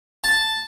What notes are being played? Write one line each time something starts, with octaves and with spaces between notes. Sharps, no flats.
A5